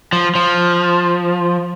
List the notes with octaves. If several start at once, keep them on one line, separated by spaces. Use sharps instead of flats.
F3
F3